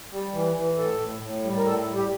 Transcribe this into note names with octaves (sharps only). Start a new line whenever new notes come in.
G3
E3
E3
A2 A4
A2
A2
G3
A#4
A2 A4
G3
G4